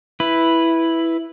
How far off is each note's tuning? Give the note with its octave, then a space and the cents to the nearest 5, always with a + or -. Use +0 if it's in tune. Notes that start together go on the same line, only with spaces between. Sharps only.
E4 +0 B4 +0